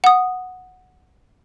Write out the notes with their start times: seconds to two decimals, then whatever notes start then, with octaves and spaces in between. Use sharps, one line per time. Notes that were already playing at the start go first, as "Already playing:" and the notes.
0.04 F#5 D#6